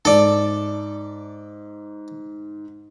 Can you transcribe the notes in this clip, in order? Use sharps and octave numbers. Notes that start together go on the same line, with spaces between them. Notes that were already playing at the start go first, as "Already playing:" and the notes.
G#2 A4 D5